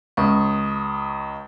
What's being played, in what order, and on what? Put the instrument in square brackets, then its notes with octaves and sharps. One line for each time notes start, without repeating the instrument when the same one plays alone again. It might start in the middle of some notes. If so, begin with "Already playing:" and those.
[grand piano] C#2 [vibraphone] C#6 D#6